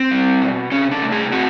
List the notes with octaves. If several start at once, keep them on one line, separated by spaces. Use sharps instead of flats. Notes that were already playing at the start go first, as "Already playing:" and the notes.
Already playing: C4
G3
B2
C3 C#4
D4
A3
G#4
C4 F#4